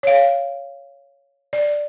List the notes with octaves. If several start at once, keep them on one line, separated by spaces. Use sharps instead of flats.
C#5 F5
D5